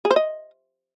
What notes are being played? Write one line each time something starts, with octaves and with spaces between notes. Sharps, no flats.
G#4
C5
D#5